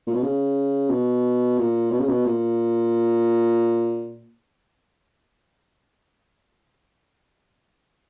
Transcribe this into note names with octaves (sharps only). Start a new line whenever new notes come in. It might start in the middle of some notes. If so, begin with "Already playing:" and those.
A#2
B2
C#3
B2
A#2
B2
C#3
B2
A#2